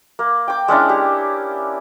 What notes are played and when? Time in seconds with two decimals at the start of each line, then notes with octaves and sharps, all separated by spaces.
0.19 A#3
0.48 G5 D6
0.68 G#3 C#4 D4 E4
0.89 G4